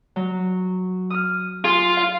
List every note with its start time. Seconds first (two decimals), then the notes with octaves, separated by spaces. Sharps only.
0.16 F#3
1.10 D#6 F6
1.65 F4 G#4 C6
1.97 F5